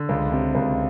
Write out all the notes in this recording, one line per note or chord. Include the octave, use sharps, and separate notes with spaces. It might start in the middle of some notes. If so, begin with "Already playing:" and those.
Already playing: D3
C#2
C3
C#2